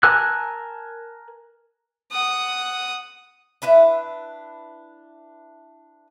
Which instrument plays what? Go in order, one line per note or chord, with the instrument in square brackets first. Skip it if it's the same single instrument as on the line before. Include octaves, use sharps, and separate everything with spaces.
[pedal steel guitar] A#4 G#5 A5 E6 F#6
[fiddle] F#5 D#6
[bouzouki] D4 E4 B4 E5